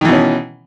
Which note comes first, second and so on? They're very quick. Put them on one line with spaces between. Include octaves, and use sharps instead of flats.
D#3 E3 B2 C#4